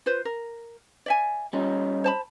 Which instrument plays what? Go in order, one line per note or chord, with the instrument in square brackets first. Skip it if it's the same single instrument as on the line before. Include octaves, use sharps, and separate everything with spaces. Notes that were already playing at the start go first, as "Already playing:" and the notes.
[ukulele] F4 B4 C5
A#4
D5 E5 G#5
[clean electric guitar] G3 C#4 D#4 [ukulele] F4
[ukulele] C5 A5 B5